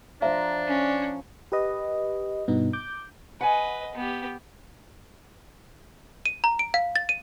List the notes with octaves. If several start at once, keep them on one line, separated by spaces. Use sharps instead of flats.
F3 D4 E5 A#5
C#4
G4 B4 D#5
G2 B2 B3 D#4
D6 G6
B4 D#5 F#5 G#5
B3 G4
D#7
A#5
D7
F5
A6
D#7